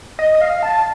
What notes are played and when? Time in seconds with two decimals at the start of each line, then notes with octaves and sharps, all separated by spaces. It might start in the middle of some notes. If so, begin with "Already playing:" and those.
0.19 D#5
0.35 D#5
0.41 F5
0.63 A5